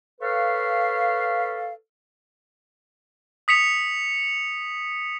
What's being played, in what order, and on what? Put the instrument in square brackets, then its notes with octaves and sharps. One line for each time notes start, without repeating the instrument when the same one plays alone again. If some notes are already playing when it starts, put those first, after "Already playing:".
[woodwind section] A4 B4 C#5 F5
[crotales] D#6 B6 C#7 F7